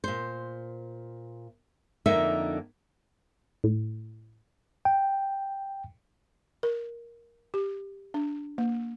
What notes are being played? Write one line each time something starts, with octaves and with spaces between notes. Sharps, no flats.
A#2 C5
F2 D3 A#3 D#4 E5
A2
G5
A#4
G4
D4
A#3